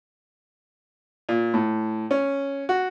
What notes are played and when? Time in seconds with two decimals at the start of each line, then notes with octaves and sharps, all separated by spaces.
1.29 A#2
1.54 A2
2.11 C#4
2.69 F#4